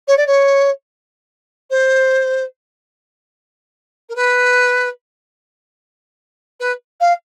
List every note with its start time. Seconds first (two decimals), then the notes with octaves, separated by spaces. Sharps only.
0.08 C#5
0.17 D5
0.27 C#5
1.70 C5
4.09 A#4
4.15 B4
6.60 B4
7.00 F5